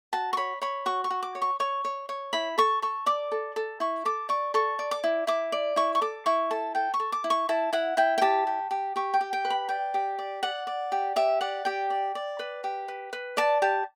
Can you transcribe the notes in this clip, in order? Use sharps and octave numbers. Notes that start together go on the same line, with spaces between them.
F#4 A5
C#6
C#5 B5
C#5 B5
F#4 C#6
C#6
F#4
D6
C#5
C#6
C#5 C#6
C#5
C#5
E4 B5
A4 C#6
A4 C#6
D5 D6
A4
A4
E4 C#6
A4 D6
D5 C#6
A4 C#6
D5
D6
E4
E4 D6
D5
E4 C#6
C#6
A4 D6
E4 C#6
A4 A5
A4 G5
C#6
A4
D6
E4
C#6
E4 A5
E4 F#5
E4 G5
G5
G4 A5
G4
G4
G4 C#6
G5
G4
G5
B4
B5
D5 G5
G4
D5
D5 F#5
D5
G4
G4 E5
D5 F#5
G4 G5
D5
D5
B4
G4
B4
B4
D5 A5
G4 A5